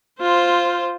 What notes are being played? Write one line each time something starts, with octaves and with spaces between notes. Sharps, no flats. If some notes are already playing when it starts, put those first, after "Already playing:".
F4 C5